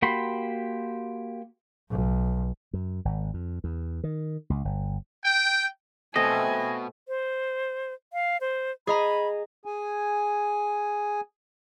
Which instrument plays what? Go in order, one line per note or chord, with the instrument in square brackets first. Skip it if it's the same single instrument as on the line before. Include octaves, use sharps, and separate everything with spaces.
[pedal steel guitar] A#3 F#4 G4 B5 C6
[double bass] B1
[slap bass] F#2
G#1
F2
E2
D#3
C#2
G1
[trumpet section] G5
[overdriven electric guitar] B2 [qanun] A3 C4 [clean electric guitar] D#5 [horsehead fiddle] G#5
[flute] C5
F5
C5
[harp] G#4 D#5 A#5 [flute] B5
[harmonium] G#4 G#5